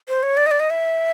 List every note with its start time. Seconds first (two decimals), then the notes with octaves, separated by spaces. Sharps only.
0.09 C5
0.23 C#5
0.37 D5
0.46 D#5
0.51 D5
0.60 D#5
0.70 E5